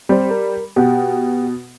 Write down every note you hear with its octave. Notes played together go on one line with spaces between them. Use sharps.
G3 C4 G4 C5
A#4
B2 G4 F#5 G5